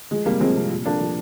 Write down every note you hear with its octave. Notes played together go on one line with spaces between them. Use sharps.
F3 G#3
C3 G3 A#3
F3 G#3 C4
C3
A#2
F3 A#3 D4
F3